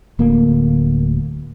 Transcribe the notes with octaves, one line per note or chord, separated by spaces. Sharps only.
D1 D2 A#3